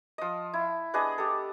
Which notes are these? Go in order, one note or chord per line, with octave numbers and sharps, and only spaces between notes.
F3 D#5
E4
B3 D4 G#4 D#5
G4 A4